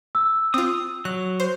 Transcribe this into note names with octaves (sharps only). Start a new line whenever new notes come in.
E6
C4 F4 D#6
F#3 F#6
C5